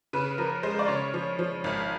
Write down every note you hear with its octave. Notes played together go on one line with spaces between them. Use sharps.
C#3 B4
F3 A#4
G#3 C5
D5
C#3 C#5
F3
F3
G#1